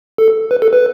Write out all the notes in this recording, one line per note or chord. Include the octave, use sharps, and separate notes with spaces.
A4
B4
A4
B4